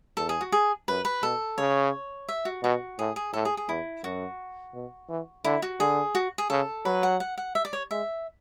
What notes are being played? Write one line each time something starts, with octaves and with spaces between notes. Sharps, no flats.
E2 A4
G#4
F#4
G#4
F#2 B4
B4
B2 A4
C#3 C#5
E5
F#4
B2 F#4
A2 G#4
G#4
A2 A4
G#4
G#4
E2 E4
F#2 F#4
B2
E3
D3 E4
F#4
D3 G#4
F#4
G#4
C#3 A4
F#3 B4
F#5
F#5
F#5
E5
D5
C#5
G#3 E5